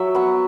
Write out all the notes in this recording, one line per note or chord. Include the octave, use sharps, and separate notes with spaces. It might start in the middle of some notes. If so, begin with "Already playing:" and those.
Already playing: F#3 E5
B3 F#5